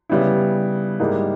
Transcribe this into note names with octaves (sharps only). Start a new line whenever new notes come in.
C#3 G3 B3 E4
G#2 G3 A#3 E4 G#4